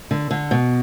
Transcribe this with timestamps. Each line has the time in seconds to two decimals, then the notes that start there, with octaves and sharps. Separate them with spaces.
0.11 D3
0.31 D3
0.51 B2